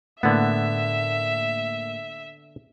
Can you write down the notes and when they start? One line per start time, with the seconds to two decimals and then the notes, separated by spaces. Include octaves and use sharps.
0.23 A2 D3 A#3 B3 E5